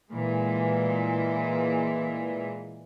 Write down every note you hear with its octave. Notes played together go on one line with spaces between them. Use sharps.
A#2 E3 G#3